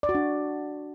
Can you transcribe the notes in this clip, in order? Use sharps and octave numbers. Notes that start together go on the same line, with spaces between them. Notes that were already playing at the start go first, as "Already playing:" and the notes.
D5
F#4
D4